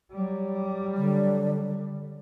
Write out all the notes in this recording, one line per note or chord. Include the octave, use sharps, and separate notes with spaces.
F#3 G3
D3